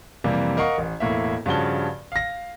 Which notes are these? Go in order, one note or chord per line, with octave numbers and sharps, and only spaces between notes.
F2 C3 E3 G3 A#3
A#4 D#5 F5 F#5 C#6
A1
E1 A2 A#3 E5
G2 C#3 F3 F#4 A5 G7
F5 A#6